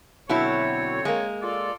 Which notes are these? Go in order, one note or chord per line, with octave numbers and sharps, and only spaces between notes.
B2 D3 F#3 C4 E4 C#5
G#3 A#3
F4 A4 D5